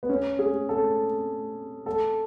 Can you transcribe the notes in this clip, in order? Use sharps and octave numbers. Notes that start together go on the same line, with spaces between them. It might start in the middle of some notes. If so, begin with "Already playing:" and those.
B3
C#4
G#4
A4
A4